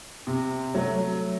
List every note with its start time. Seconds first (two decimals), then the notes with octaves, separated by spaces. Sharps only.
0.27 C3
0.74 F#3 A3